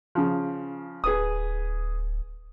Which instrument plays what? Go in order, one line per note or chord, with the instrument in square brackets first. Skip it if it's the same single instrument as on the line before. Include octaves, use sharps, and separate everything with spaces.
[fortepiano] C#3 F3
[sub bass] D1 [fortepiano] G#4 B4 D#6